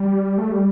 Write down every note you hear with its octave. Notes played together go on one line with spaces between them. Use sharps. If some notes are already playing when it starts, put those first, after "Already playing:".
Already playing: G3
A3
G3